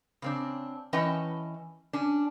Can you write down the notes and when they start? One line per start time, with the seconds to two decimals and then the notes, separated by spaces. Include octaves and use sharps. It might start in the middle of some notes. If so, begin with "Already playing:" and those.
0.22 C#3 C4 D4
0.93 E3 C#4 B4 D#5 G5 A5
1.93 C#4 D4